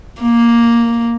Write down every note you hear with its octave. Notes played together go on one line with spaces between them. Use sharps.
A#3